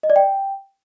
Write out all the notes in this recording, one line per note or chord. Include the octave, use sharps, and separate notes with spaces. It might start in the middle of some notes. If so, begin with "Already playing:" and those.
D#5
D5
G5